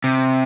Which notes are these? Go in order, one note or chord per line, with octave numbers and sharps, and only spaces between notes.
C3